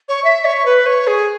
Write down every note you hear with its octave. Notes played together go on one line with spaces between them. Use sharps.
C#5
E5
C#5
B4
C#5
G#4